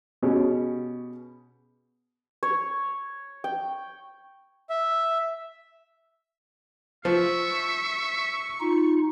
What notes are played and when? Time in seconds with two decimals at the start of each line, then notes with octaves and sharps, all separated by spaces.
0.22 B2 C#4 G4 G#4
2.43 C#5
3.44 G5
4.70 E5
7.05 F3 E5 C#6
8.60 D#4 F4